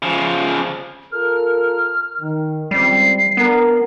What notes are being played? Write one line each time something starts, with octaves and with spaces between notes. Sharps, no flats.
C#3 F3
F4 A4 A#4 F6
D#3
C#2 G3 C4 C7
B3 D4 A#4